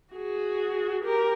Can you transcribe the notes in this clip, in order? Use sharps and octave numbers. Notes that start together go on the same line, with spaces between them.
F#4 G#4
G4 A#4